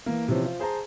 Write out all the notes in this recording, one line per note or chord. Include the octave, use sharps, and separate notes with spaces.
E3 A#3
C3 E3 F3 C4 C#4
F4 C5
G#4 C5 A5 A#5